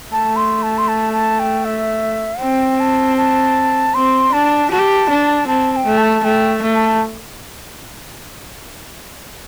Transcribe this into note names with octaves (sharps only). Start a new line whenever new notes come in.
A3 A5
C6
A5
C6
A5
A5
G5
E5
C4 G5
A5
A5
C4 C6
D4 A5
G4 A5
D4
C4 A5
A5
G5
A3
A5
A3 G5
A3
A5